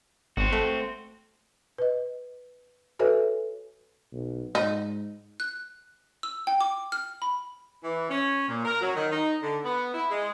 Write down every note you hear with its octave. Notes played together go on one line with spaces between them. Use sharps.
G#1 C4 F#4
A3
B4 D#5
F#4 A4 B4 C#5 E5 G#5
B1
G#2 D#4
F#6
E6
G5
D6
F6
B5
E3
C#4
A#2
A#4
F#3
D#3
D#4
D3
B3
E4
G#3